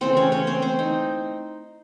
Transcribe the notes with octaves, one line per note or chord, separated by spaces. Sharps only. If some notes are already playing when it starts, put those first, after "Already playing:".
C#3 E3 A3 C4 C5
C#4 C#5
C#4 C#5
C4 C5
C4 C5
D#4